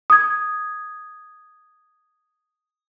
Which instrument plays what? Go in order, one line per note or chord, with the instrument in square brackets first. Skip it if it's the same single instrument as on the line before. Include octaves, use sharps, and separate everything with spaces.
[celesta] D#6 G#6